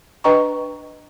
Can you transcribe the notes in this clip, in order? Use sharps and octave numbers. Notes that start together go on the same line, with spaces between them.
D4 B4 D#5 G5 A#5 C#6